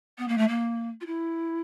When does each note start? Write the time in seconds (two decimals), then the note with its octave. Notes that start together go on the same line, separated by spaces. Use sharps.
0.18 B3
0.28 A#3
0.37 A3
0.48 A#3
1.00 F4
1.06 E4